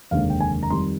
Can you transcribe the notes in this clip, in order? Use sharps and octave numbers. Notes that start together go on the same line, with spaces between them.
F1 D#2 D3 G#3 F5
G5
G#5
A#5
F2 D#3 G3 C6